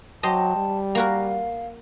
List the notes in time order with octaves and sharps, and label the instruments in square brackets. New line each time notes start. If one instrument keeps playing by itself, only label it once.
[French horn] F#3 [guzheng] G4 C5 D#5 [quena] A5
[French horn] G3
[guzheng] A#3 F#4 A#4 [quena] F5